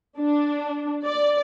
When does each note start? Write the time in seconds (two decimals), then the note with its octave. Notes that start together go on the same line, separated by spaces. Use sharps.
0.18 D4
1.05 D5